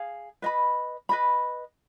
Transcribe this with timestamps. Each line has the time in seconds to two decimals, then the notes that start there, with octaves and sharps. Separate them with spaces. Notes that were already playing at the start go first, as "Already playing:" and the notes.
Already playing: G#4 F5
0.42 B4 D#5 B5
1.09 B4 D#5 B5